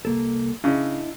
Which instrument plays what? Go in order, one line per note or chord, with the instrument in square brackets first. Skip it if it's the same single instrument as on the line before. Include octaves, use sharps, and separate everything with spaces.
[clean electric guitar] C2 A#3 A4
[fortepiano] C#3 [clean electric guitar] D4 E4 D#5